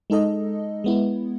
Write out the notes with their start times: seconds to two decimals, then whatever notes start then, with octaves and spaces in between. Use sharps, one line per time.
0.10 G#3 D#4 A4 D#5
0.84 G#3 B3 E4